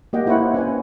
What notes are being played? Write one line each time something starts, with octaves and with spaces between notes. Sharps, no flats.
A#3 G4 D#5 F#5 G5
A#3 E4 C5 C#5 F#5
C#4 B4 F#5 G#5